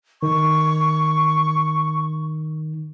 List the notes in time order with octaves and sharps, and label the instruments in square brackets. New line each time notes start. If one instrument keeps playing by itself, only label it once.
[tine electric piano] D#3 [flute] C#6